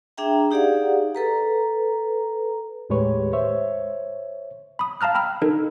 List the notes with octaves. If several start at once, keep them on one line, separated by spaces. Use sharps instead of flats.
D4 G#4 E5 G5 A#5
D#4 G4 G#4 D5 F5 F#5
A4 B4 A#5
D#2 A2 G#3 G4 B4 C#5
C5 C#5 E5
B5 D#6
F5 A5 A#5 F6 F#6
G5 B5 E6 F6
D#4 A4 A#4